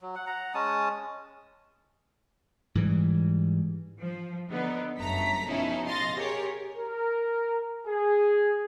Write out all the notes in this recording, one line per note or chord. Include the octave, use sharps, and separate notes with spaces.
F#3
F#5
F#5 A#5
G#3 C#4 A5 D#6
G#2 E3 G3
F3
D3 B3 D#4
G1 F#2 A3 A#5 B6
B2 F3 C#4 D#4 E4 A4
D#5 F5 C6 A6 A#6
G4 G#4 A#4 C#5
A#4
G#4